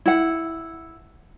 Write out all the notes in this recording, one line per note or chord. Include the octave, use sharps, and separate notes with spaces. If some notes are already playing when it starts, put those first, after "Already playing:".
E4 F#5